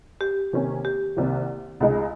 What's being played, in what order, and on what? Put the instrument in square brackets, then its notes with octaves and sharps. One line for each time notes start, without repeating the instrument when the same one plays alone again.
[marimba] G4
[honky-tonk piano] C3 D#3 A#3 C#4
[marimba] G4
[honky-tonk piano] C2 C3 D#3 A#3
C#2 C#3 G#3 D#4